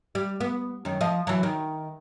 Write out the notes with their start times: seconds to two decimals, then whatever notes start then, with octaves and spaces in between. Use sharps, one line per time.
0.15 G3
0.41 B3
0.85 F#2 D#3
1.01 F3 D#5
1.27 E3 F#3
1.43 D#3